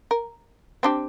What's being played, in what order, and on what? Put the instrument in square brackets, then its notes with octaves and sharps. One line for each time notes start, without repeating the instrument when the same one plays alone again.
[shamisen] A#4
C4 D4 G4